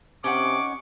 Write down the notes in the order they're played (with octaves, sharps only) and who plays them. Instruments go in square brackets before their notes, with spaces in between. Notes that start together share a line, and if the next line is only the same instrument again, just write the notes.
[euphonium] C3 [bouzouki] C#4 D#4 F#5 [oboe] C#6 [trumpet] D6